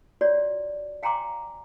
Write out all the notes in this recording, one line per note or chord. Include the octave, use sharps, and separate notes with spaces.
F4 F#4 C#5 D5
F5 G5 G#5 A#5 C6 D6